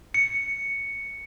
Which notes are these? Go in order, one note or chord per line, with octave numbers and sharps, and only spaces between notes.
C#7